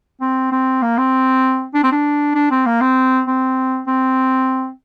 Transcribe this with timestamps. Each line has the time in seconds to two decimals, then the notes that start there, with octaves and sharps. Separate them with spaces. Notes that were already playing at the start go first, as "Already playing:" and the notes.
0.21 C4
0.52 C4
0.82 A#3
0.97 C4
1.74 D4
1.84 C4
1.92 D4
2.35 D4
2.51 C4
2.66 A#3
2.81 C4
3.27 C4
3.87 C4